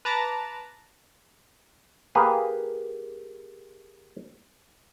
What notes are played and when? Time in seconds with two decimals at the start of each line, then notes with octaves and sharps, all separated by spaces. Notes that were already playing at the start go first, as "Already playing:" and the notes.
0.05 B4 A5 A#5 D6 A6
2.15 A#3 G4 G#4 B4